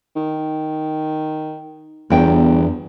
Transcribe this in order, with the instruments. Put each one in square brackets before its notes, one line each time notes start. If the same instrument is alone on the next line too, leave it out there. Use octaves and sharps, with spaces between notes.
[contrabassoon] D#3
[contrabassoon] G1 [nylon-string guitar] E2 G5